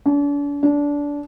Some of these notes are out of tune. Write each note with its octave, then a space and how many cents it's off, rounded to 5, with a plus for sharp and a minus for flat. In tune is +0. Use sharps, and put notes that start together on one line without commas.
D4 -40
D4 -20